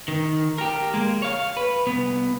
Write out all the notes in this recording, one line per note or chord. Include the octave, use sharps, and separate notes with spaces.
D#3
G4 A#4
G#3 A#3
C#5 F5
B4
C2 B3